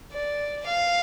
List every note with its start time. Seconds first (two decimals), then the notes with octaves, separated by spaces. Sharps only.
0.13 D5
0.67 F5